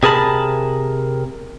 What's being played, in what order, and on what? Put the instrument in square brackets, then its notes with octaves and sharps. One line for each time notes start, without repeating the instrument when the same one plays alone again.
[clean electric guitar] C3 G#4 A#4 A5 B5